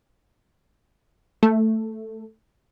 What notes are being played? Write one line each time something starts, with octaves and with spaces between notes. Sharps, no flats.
A3